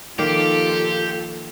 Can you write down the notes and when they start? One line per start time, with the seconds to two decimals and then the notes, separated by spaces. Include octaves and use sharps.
0.19 D#3 F3 A#3 F4 G4 A4